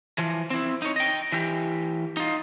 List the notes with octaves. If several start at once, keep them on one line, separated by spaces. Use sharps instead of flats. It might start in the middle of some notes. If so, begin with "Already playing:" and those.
E3 F3
C4 E4
D#4 C#5
D#5 G5
E3 G4
D#4 F4